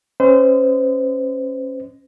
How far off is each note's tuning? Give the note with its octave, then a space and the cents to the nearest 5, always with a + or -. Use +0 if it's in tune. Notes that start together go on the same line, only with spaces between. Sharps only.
C#4 -20 C5 -35 D#5 +0